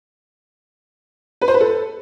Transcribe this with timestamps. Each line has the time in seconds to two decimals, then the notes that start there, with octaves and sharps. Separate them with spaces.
1.42 B4
1.48 C5
1.54 B4
1.60 A4